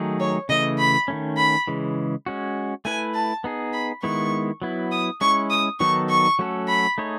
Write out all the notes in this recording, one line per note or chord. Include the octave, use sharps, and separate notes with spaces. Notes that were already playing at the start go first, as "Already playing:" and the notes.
Already playing: D#3 F#3 A3 D#4 G#4
C#5
C#3 E3 A3 D#5
B5
D#3 A3 C#4
B5
C#3 E3 G#3
G#3 C#4 F#4
A3 E4 B4 G#5
A5
B3 D#4 G#4
B5
D#3 G#3 B3 E4 C#6
F#3 B3 E4
D#6
G#3 C#4 E4 C#6
D#6
D#3 F#3 B3 D#4 A4 C#6
C#6
F#3 A3 C#4 F#4 A4
B5
A3 D#4 G#4 C#5